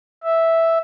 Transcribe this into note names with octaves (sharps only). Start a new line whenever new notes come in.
E5